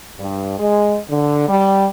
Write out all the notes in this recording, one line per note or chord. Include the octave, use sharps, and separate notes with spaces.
G2
G#3
D3
G3